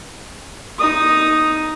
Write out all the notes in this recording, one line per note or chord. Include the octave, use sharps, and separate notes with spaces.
D#4 D#6